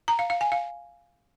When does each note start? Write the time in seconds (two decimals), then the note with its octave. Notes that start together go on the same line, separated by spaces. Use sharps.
0.08 A#5
0.19 F5
0.30 F5
0.41 G#5
0.52 F5